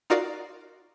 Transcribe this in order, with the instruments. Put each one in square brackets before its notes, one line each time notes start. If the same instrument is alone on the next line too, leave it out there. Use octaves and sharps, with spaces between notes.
[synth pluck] D#4 F4 F#4 A#4 D5 F5